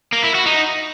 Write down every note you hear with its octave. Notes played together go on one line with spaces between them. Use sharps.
A#3
E4
F#4
D#4